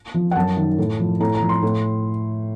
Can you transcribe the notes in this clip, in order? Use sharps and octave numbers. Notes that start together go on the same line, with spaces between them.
F3
F#5
F#2 A5
D#3
A2
F3
A2 A#5
A#5
F3
C6
A2